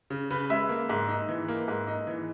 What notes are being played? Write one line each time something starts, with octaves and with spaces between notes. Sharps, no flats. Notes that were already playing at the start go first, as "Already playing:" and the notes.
C#3
C#3 B4
G#3 E5
A#3
G#2
D#4
E3
A#3
G#2
D#4
E3